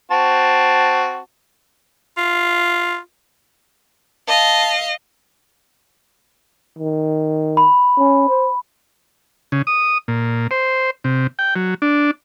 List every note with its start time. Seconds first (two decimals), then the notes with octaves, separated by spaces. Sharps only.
0.11 C4 F#4 A5
2.17 F4
4.28 D#5 F5 A5
6.79 D#3
7.57 B5
7.98 C#4
8.29 C5
9.52 C#3
9.67 D#6
10.08 A#2
10.51 C5
11.04 C3
11.39 G5
11.56 F#3
11.82 D4